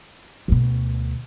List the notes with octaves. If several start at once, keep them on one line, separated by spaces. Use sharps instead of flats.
D2 B2